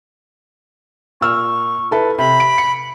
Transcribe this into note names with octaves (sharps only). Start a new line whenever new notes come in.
A#2 C#6 E6 F6
E4 A4 B4
C3 B5
D7
C#7